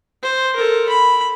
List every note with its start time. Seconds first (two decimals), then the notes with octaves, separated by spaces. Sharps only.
0.23 C5
0.56 A4 A#4
0.89 B5